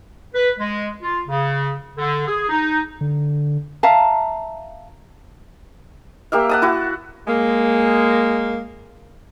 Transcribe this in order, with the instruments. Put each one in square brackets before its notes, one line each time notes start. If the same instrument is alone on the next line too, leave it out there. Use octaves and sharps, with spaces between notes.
[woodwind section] B4
G#3
F4
C#3
D3
G#4
D#4
[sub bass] D3
[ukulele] E5 F5 A5 A#5
[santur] A#3 G4 E5 F5
F#5 A5 D#6
E4 F#4
[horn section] G#3 A#3